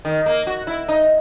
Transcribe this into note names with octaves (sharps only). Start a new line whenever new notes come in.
D#3
A#3
F#4
E4
D#4